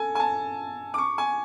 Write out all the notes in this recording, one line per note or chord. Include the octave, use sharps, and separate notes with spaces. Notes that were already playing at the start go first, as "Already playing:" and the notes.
Already playing: A4 G#5
G#5
A5
D6
C#6
G#5